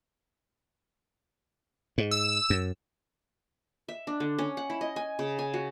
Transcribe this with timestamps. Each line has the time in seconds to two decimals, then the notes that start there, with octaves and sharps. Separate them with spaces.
1.98 G#2
2.11 E6
2.50 F#2
3.88 E5
4.07 D4
4.20 D3
4.38 C#4
4.57 F#5
4.70 E4
4.81 D#5
4.96 G#5
5.19 C#3
5.39 G#5
5.54 F#4